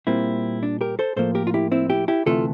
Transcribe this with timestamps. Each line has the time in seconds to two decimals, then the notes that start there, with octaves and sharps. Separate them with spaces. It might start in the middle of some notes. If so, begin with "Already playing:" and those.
0.07 A#2 G3 A#3 C4 E4
0.63 D4
0.81 G4 A#4
0.99 A4 C5
1.16 A2 F3 A#3 A4 C5
1.35 G4 A#4
1.47 F4
1.54 E4 G4
1.72 C4 E4
1.90 E4 G4
2.08 E4 G4
2.26 D2 C3 E3 A3 F4 A4